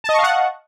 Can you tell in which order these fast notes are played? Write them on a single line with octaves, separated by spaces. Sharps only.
A5 D#5 C#6 F5 F#5